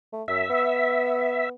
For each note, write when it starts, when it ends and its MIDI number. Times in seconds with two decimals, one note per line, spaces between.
0.13 0.23 57
0.28 0.45 42
0.28 1.49 76
0.50 1.54 59